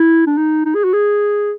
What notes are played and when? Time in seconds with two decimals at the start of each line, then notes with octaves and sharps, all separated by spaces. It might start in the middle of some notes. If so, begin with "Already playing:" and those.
Already playing: E4
0.27 D4
0.37 D#4
0.65 D#4
0.75 G#4
0.85 F#4
0.94 G#4